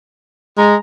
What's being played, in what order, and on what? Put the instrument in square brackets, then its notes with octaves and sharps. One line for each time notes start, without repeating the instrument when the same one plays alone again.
[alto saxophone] G#3 [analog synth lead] A#5